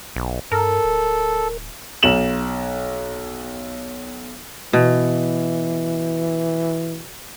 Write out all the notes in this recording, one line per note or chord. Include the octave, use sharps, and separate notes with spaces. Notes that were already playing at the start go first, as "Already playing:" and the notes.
B1
G2 A4 A#4
D1
B1 E7 F#7
B2 E3